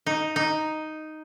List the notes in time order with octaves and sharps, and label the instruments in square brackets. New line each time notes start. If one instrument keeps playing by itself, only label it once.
[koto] D#4
D#4